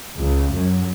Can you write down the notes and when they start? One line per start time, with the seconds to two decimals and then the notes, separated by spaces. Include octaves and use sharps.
0.18 C#2
0.53 F#2